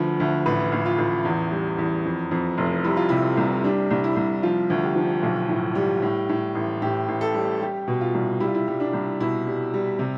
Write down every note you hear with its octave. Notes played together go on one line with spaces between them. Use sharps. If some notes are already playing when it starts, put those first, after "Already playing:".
Already playing: D2 D3 F3 B4
D2
A1 B4
A1
F4
A1
E2
G3
E2
F2
F2
F1
G3 E4
F4
C3 E4
C2
G3 D4
C2
E4
C2
F3 F4
D2
G4
F3
B1
A2
G3
A2
A2
A1
A2 G4
A1
A4
G3
G3 G4
B2
F4
C2
G3 E4
F4
E4
G3
D4
C2
B2 E4
G3
G3
C3